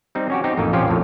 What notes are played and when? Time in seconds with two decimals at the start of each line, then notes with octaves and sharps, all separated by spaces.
0.15 G3 C4 D#4
0.30 C#4 F#4 G4
0.44 C4 D#4 G4
0.57 A1 F2 A#3 D#4
0.73 A#1 F3 C#4 F4 G4
0.88 A#1 F2 A2